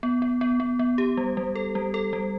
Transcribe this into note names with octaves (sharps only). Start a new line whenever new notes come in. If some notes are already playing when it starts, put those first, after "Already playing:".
B3
B3
B3
B3
B3
G4
G3
G3
A4
G3
A4
G3